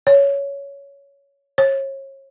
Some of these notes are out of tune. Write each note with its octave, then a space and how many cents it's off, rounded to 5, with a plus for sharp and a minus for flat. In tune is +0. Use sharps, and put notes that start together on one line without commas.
C#5 +15
C#5 -35